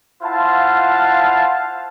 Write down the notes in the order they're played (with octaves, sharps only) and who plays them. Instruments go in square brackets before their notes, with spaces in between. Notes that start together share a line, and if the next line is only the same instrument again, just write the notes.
[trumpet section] E4 F4 C5 F5 F#5 A5